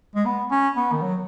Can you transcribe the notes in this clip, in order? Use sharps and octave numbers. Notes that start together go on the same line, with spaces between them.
G#3
B3
C#4
B3
D#3
F#3